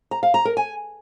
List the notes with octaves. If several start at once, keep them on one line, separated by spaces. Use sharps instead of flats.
A#5
F5
A#5
A#4
G#5